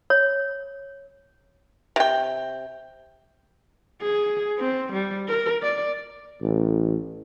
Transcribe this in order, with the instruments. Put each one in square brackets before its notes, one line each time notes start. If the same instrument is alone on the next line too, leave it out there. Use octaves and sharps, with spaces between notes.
[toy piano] C#5
[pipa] C3 G5
[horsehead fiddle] G#4
C4
G3
A#4
D5
[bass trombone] A1